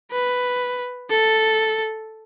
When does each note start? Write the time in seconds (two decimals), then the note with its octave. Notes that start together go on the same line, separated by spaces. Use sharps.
0.11 B4
1.10 A4